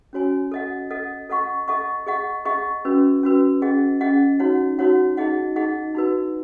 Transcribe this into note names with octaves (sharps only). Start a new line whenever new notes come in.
C#4 F#4 C#5 G#5
A4 D#5 F#5
A4 D#5 F#5
A4 D#5 F#5 C#6
A4 D#5 F#5 C#6
G#4 D#5 F#5 C#6
G#4 D#5 F#5 C#6
C#4 F#4 B4
C#4 F#4 B4
C#4 G#4 D#5 F#5
C#4 G#4 D#5 F#5
D#4 F#4 C#5 F#5
D#4 F#4 C#5 F#5
D#4 G#4 D#5 F#5
D#4 G#4 D#5 F#5
D#4 F#4 B4